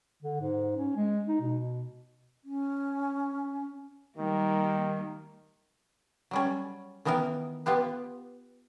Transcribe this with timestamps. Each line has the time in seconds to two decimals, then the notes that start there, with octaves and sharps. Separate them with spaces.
0.23 D3
0.41 G#2
0.76 C#4
0.96 G#3
1.28 D#4
1.41 B2
2.44 C#4
4.18 D#3 G3 A#3
6.31 F#3 G3 C#4
7.05 D#3 E3 B3 D#4 A#4
7.66 B3 F4 G4 B4